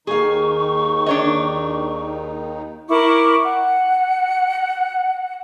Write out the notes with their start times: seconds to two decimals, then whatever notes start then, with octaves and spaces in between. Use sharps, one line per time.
0.07 D#2 D#3 D#4 G#4 F5 C#6
1.06 D4 C#5 D#5
2.88 E4 A#4 C#6 D6
3.44 F#5